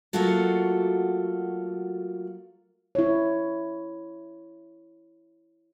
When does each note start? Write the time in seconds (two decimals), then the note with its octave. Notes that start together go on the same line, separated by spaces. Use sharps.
0.13 F#3 A3 A#3 F4 F#4 A4
2.95 E4 C#5